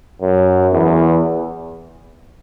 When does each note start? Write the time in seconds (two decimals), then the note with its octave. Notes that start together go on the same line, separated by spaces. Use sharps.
0.21 F#2
0.73 E2